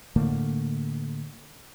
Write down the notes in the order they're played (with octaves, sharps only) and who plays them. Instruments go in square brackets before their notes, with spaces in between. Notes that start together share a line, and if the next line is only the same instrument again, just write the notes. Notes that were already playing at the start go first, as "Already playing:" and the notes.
[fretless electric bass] A2 D3 A3 A#3